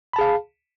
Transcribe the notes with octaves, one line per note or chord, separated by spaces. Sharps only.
G#4 F5 A5 B5